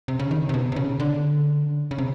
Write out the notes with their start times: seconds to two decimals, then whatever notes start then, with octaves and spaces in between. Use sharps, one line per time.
0.08 C3
0.19 C#3
0.31 D#3
0.49 C3
0.54 B2
0.72 C3
0.76 C#3
1.00 D3
1.91 C#3
1.98 C3